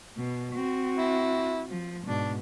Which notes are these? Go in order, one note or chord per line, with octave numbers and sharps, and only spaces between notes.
B2
C4 F#4
E4
F3
G#2 B2 D4